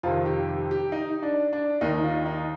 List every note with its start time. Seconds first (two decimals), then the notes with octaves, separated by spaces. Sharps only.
0.03 F2 C3 D#3 F4
0.26 G4
0.49 G4
0.71 G4
0.92 D#4
1.23 D4
1.53 D4
1.81 D#2 D#3 D#4
2.03 F4
2.26 D#4